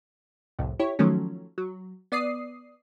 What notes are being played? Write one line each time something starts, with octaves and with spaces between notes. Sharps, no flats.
C2 F2 A2
E4 G4 C#5
D#3 F3 F#3 A3 C#4
F#3
B3 D5 D#6 C7